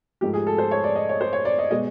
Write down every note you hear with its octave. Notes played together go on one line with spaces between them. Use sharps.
G#2 F3 A3 G4
G#4
A4
C5
C#5
D5
D#5
C#5
C5
C#5
D5
D#5
B2 G#3 B3 D#5